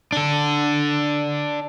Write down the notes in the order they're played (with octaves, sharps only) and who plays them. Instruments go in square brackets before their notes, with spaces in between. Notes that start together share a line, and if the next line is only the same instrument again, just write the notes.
[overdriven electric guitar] D4 A4